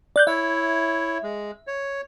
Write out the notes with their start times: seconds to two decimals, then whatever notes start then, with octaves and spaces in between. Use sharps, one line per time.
0.16 D5 F#6 G6
0.27 E4 C#5 E5
1.23 G#3
1.67 C#5